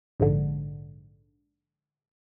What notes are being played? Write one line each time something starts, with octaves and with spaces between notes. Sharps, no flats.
A#1 G#2 D3